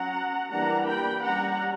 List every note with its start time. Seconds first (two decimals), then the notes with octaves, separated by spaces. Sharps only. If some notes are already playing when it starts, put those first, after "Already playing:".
Already playing: F#3 C#4 F#5 A#5
0.50 E3 G3 A#3 D4 F#5 A#5
0.87 G5 B5
1.23 G3 C#4 F#5 A#5